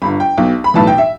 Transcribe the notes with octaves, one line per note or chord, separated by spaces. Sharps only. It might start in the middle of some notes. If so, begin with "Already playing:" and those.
G1 G2 D3 B5
G5
B1 B2
B5
B1 A2 E3 A5
G5
E5